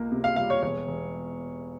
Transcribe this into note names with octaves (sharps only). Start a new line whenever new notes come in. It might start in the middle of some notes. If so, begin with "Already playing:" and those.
Already playing: C#2 A#3
C3
F5
G3 F5
C#5
E1 C#5
E1